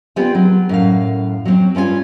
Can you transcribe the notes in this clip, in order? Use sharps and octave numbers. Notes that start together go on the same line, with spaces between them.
B3 C4 D4 F4 G4 G#4
F#3
F#2 A2 F5
F#3 C4
G2 C#4 F4 B4 G#5